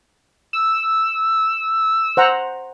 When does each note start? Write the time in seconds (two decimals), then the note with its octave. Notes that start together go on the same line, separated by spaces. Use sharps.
0.53 E6
2.17 C5 F#5 A#5